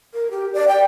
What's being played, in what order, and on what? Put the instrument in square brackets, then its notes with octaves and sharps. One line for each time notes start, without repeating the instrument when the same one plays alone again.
[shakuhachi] A#4
G4
D5
G5